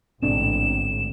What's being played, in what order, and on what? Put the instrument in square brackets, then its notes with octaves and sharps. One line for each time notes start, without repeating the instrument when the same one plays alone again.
[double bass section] A1 [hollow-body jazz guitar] G#2 B2 D3 [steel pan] C4 D4 [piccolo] E7